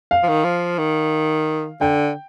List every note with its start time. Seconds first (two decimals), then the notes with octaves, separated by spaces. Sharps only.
0.11 F5
0.23 F3
0.28 D#3
0.44 F3
0.78 D#3
1.81 D3 G5